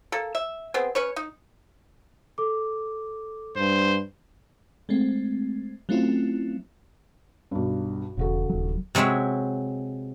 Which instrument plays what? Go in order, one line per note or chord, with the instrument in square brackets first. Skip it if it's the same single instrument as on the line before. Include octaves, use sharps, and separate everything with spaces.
[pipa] A#3 A4
E5
B3 C4 G#4
C#4 B4 C#5
D#4
[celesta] A4 D6
[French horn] G2 [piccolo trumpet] C5
[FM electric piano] G#3 A3 C4
F#3 A3 C4 C#4 E4 F4
[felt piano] B1 G2
[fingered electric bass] E1 [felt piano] C#3 F#4 A4
[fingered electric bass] D#1 F#3
[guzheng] C3 F#3 G#3 C#5 E5